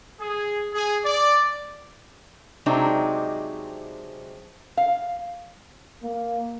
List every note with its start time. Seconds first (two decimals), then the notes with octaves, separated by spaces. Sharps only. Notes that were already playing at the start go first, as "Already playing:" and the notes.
0.20 G#4
0.74 G#4
1.05 D5
2.66 C3 F#3 G#3 C4 D4 D#4
4.77 F5
6.03 A#3